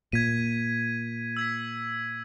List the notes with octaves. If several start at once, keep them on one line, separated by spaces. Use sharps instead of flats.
A#2 G#6 B6 D#7
E6 G#6 B6